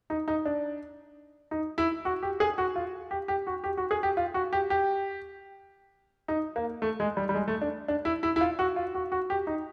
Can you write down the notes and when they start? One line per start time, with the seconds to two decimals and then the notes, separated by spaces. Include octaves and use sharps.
0.10 D#4
0.28 D#4
0.45 D4
1.51 D#4
1.78 E4
2.05 F#4
2.23 G4
2.40 G#4
2.58 F#4
2.76 F4
3.11 G4
3.28 G4
3.47 F#4
3.64 G4
3.77 F#4
3.91 G#4
4.03 G4
4.17 F4
4.34 F#4
4.53 G4
4.70 G4
6.28 D#4
6.56 A#3
6.82 A3
7.00 G#3
7.17 G3
7.29 G3
7.35 G#3
7.48 A3
7.61 D4
7.88 D4
8.05 E4
8.23 E4
8.36 E4
8.41 F4
8.59 F#4
8.76 F4
8.95 F#4
9.12 F#4
9.30 G4
9.47 D#4